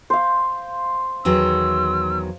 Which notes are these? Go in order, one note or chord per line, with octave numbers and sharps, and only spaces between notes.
C5 F5
E2 D#3 F#3 E6